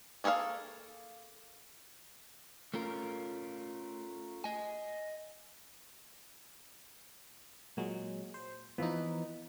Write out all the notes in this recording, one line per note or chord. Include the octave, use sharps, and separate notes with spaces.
A#3 G#4 A4 C5 F5
A3 C#4 F4 A#4
D#5 G#5
A#2 F#3 G#3
C5
E3 F3 B3 D#4